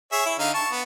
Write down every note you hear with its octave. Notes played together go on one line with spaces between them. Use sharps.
G#4 C#5 E5
E4
D3 D#4 F5
A5 C#6
B3